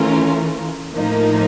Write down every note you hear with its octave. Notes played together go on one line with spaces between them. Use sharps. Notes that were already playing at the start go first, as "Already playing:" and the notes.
Already playing: E3 A3 C#4 F4 A#4
A2 F3 A#3 D#4